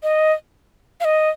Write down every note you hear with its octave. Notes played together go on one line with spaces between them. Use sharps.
D#5
F5
D#5